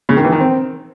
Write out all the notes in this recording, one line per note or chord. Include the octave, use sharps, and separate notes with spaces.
C#3
D#3
E3
D#3
C4